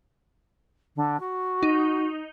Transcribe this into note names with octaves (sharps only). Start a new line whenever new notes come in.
D3
F#4
D#4